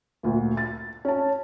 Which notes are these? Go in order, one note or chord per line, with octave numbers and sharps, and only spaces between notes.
D2 A#2
A6
C#4 A5